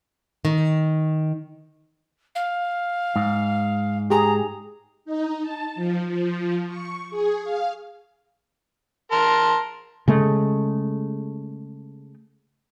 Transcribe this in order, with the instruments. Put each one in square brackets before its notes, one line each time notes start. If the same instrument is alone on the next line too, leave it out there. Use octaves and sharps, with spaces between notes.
[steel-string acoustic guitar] D#3
[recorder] F5
[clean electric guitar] G#2
[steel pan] G4 G#4 [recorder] A#5
[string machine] D#4
A5
F3
F3
C#6
G#4
F5
[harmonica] A#4 A5 C6
[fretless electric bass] C#3 G#3 A3